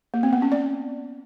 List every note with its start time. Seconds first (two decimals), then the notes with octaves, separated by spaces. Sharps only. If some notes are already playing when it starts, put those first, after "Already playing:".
0.14 A#3
0.23 C4
0.33 B3
0.42 C#4
0.52 D5